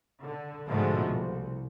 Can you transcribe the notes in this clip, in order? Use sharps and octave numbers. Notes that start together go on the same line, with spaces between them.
D3
G#2 B2 D3 F3 G#3 A3
C2